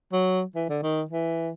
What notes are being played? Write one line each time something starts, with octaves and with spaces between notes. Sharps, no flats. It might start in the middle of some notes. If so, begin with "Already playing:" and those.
F#3
E3
D3
D#3
E3